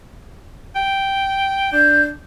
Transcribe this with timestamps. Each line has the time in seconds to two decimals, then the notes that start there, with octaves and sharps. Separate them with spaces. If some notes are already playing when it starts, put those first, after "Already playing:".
0.76 G5
1.72 D4 G6